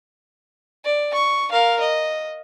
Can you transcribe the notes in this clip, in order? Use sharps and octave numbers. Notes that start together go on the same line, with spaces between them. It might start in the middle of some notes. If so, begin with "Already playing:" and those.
D5
C#6
A#4 F5
D#5